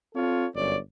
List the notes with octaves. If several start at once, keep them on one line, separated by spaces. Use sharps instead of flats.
C4 F4 A4 C#5
G1 F#2 C#5 D5